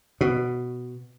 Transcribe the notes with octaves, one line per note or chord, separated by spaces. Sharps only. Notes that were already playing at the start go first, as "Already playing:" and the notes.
B2